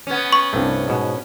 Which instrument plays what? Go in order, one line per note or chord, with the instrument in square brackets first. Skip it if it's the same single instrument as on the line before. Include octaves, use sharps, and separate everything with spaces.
[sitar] B3 C#4
[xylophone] C#6
[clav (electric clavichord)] C2 G2 A3
G#2 B2